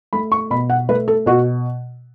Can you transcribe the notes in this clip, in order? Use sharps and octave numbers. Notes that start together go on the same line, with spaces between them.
A3 B5
C#6
B2 B5
F#5
A3 B4
A4
B2 F#4